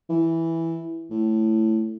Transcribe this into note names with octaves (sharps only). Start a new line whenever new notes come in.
E3
A2